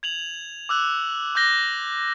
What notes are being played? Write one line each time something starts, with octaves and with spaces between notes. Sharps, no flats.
G#6 F7 F#7
D6 E6 F#6
D6 F#6 G6 A#6 G7